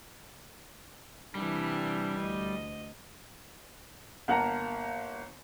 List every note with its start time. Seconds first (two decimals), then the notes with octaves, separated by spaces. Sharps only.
1.35 C3 E3 G3 D4
2.20 D2 D#5
4.28 G1 A#3 F#5 A5 A#5